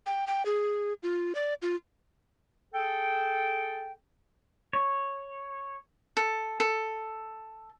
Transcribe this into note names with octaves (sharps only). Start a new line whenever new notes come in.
G5
G5
G#4
F4
D5
F4
G#4 A4 G5
C#5
A4
A4